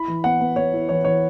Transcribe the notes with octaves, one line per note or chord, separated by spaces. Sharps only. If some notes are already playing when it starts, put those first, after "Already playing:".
Already playing: E4 B5
E3
B3 F#5
B3
B3 C#5
E4
E3 C#5
E3 C#5